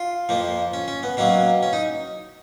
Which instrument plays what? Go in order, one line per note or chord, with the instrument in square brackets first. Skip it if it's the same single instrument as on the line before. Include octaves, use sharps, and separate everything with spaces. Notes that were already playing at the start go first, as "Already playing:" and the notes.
Already playing: [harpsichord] F4
F2 F3 A#3
C#4
C#4
B3
B2 F#3 A#3 C#4
C#4
D#4